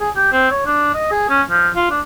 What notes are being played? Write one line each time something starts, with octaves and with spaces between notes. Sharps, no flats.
G#4
G4
C4
C#5
D4
D#5
G#4
C#4
F3
F4
D4